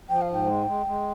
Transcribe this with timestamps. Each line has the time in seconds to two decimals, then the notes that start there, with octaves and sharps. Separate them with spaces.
0.09 F3 G5
0.22 F5
0.28 G#2 G5
0.47 G#3
0.66 G#3
0.86 G#3